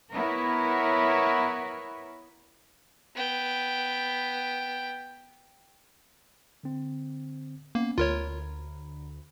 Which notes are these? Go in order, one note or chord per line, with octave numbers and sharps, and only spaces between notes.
B3 E4 A#4 B4 C#5
B3 G5
D3 C4
A#3 B3 C#4
D2 F4 A#4 C#5 A#5 B5